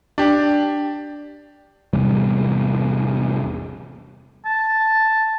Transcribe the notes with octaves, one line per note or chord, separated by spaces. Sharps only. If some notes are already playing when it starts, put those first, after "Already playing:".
D4 G4
A1 E2 C3 G3
A5